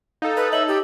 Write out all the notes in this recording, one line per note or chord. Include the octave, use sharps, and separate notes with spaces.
D#4 A4 D#5 F5
B4
C#5 D#5 E5 F#7
G4